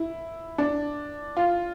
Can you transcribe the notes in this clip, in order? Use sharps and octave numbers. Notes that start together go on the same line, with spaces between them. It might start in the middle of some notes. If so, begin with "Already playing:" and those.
Already playing: E4
D4
F4